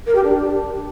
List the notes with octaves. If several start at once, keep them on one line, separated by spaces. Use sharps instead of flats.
A#4
G4
D4